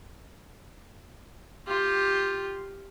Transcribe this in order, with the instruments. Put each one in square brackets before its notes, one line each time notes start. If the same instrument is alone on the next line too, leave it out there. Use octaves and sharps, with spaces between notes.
[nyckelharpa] F4 G4